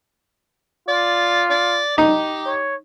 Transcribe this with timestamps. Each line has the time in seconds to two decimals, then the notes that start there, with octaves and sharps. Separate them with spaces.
0.88 F4 D5
1.50 D5
1.98 D#4 G4
2.46 C#5